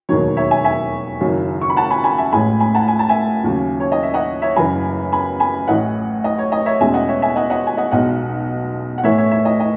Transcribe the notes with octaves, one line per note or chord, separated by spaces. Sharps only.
E1 D#2 D#3 F#3 C#5
C#5 E5
E5 G#5
E5 G#5
F#1 F#2 D#3 F#3
C#6
B5
F#5 A5
G#5 B5
G#5 B5
E5 G#5
A1 A2 G#3 G#5 B5
G#5 B5
F#5 A5
G#5
A5
E5 G#5
D#2 C#3 F#3
C#5
D#5
E5
D#5 F#5
C#5 E5
F#1 F#2 E3 G#5 B5
G#5 B5
G#5 B5
A1 A2 E3 D#5 F#5
D#5
C#5
D#5
C#5 E5
E2 B2 G#3 C#4 E5 G#5
D#5 F#5
C#5 E5
E5 G#5
D#5 F#5
D#5 F#5
G#5
D#5 F#5
B1 B2 G#3 D#4 D#5 F#5
F#5
A2 E3 A3 C#5 E5
C#5 E5
C#5 E5
D#5
D#5